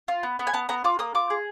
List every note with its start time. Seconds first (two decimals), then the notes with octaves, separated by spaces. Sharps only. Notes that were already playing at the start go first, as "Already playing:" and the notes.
0.08 F4
0.23 B3
0.39 B3
0.47 G#5
0.53 B3 A5
0.69 B3 A#5
0.84 F4 D6
0.99 A#3 D#6
1.15 F4 D6
1.30 G#4